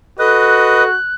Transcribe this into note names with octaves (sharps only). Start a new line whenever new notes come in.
F#4 A4 B4 D#5 F#6